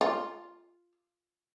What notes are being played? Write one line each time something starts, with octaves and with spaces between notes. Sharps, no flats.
F4